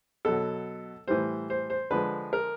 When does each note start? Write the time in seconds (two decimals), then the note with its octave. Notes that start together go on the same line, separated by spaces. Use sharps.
0.25 B2 F#3 A4
1.08 A2 E3 G3 C5
1.50 C5
1.70 C5
1.91 D3 F3 G#3 B4
2.33 A#4